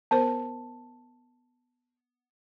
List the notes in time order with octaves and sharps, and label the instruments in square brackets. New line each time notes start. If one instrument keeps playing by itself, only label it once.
[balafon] B3 A#4 C5 [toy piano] A5